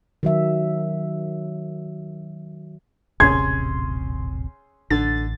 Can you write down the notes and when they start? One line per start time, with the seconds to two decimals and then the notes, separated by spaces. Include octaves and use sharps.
0.23 D#3 F#3 E5
3.20 D#1 A1 C3 C#4 G#4 C6 G#6
4.90 A1 D3 A6